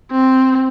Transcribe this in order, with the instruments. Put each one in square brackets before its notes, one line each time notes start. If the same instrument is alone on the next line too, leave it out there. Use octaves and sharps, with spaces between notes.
[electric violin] C4